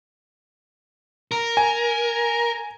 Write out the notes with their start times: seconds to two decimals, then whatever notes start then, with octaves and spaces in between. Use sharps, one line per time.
1.32 A#4
1.57 G#5